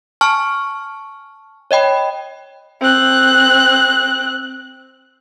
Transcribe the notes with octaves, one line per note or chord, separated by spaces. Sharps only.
G#5 A5 C#6 F6
C#5 D#5 G5 B5
C4 F#6